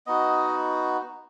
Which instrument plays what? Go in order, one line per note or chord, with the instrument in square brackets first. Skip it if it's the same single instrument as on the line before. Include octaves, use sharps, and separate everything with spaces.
[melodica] B3 D#4 F#4 D#5